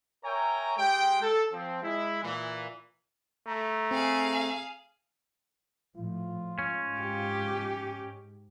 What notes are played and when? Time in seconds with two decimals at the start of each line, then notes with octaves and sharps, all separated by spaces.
0.24 A#4 C#5 E5 G5 G#5 A#5
0.77 G#3 G4 G5
1.22 A4
1.52 F3 C4
1.83 G#3 E4
2.23 A#2 E3
3.47 A3 A#5
3.91 C4 G#4 F5
5.96 A2 F3 F4
6.59 G#2 C#4
6.98 G4